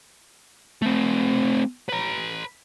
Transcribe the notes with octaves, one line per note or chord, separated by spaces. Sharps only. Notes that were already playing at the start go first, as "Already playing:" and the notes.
A3 C4
B4 A#5